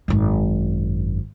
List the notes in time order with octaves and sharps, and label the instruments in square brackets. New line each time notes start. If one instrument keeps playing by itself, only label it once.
[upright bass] G#1 F#2